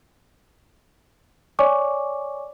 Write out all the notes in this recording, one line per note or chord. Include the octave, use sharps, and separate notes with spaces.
C#5 D5 G#5 C#6 D6